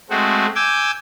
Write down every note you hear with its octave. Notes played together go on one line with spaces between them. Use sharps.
G#3 A3 C4 F#4
G#5 D6 E6 G6